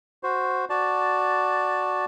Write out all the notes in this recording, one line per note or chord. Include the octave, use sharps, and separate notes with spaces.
F#4 C5
F#4 D5 A5